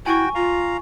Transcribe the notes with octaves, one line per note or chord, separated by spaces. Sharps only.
E4 F#4 G5 G#5 C#6
F4 F5 A#5